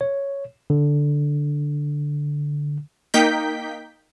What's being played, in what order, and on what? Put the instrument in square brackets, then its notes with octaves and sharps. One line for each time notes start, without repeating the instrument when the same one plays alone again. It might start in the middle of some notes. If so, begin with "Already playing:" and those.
[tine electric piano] C#5
D3
[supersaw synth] A#3 D#4 G5 G6 B6